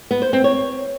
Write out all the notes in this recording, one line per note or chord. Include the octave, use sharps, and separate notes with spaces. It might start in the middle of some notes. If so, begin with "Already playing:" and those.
B3
C5
C4
C#5